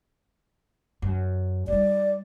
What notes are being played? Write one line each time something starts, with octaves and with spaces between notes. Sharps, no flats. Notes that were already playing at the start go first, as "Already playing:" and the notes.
F#2
G3 D#4 D5